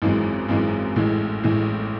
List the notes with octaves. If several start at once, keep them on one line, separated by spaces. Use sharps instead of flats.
G#1 F#2 E3 G#3
G#1 F#2 E3 G#3
A1 A2 E3 G#3
A1 A2 E3 G#3